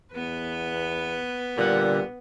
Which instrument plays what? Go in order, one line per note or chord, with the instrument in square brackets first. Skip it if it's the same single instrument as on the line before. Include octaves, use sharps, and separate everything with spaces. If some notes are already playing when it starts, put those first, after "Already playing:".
[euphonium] E2 [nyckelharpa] B3 B4
[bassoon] A#2 [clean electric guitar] D3 F#5 [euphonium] G3